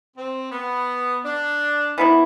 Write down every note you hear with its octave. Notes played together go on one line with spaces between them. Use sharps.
C4
B3
D4
E3 B3 E4